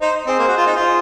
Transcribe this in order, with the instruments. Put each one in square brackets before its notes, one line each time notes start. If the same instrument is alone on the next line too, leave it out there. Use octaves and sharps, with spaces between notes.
[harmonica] D#4 [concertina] C5
[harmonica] C4 [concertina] G#4 C5
[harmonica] A#3
F#4
F4
D#4
[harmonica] F4 [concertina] G#4 C5